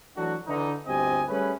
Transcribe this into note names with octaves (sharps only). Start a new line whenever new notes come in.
E3 F#3 A3 D4 F#4
D3 E3 D#4
G1 D2 C4 G4 D#5 G#5
G3 A3 C#4 G#4 B4